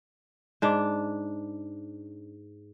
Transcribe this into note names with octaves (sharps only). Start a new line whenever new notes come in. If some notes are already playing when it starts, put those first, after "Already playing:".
G#2 D4